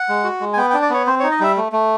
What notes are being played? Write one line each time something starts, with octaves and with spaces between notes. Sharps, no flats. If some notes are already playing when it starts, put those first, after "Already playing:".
Already playing: F#5
G#3
F#4
G#3
G#5
B3 G5
D4 G5
D5
B3 C#5
C4 C5
D#4 C#5
D#5
G3 E5
A3
A3